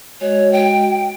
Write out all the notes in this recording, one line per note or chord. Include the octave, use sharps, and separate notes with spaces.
G#3 F#4 C#5 D#5
G5